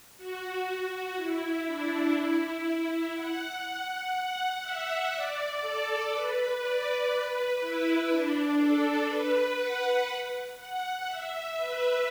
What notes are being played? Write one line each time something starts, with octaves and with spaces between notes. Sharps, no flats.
F#4
F#4
E4
D4
E4
F#5
F#5
E5
D5
A4
B4
D5
B4
E4
D4
A4
B4
F#5
F#5
E5
B4